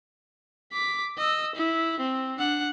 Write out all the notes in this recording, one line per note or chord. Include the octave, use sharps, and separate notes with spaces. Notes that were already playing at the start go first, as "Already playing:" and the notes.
D6 B6
D#5 E6
E4
C4
D4 F#5